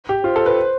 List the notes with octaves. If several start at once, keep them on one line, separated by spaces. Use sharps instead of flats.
G4
F4 C5
A4
B4